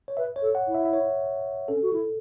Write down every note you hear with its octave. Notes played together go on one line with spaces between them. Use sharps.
C#5
B4 E5
C#5
A4
F#5
E4
E5
E5
C#5
C#4 A4
F#4
E4